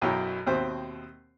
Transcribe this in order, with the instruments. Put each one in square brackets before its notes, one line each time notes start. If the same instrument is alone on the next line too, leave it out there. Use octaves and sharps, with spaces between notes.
[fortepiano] B1 F#2 B2 E4 C#5 G5
D#2 B2 D#3 C4 C5 E5